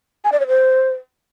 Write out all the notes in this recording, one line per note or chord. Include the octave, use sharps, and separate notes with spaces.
G#5
D5
C#5
C5